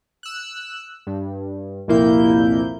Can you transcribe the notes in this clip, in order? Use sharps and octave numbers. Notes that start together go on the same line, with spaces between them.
E6 F#6
G2
C2 F2 A#2 A#3 E4 G6